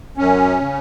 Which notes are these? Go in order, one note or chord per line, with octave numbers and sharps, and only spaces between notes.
F#2 C#4
C#3